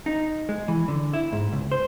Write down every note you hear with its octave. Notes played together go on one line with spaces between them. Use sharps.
D#4
G#3
E3
D3
E4
G#2
C#2
C5